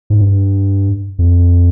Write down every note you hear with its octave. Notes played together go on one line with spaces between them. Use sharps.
G#2
G2
F2